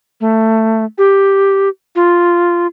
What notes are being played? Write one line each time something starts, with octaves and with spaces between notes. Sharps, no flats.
A3
G4
F4